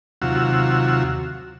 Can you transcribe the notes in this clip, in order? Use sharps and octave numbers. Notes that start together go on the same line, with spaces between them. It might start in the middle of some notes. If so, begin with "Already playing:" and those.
D#2 C3 F#3 F4 F#4 E6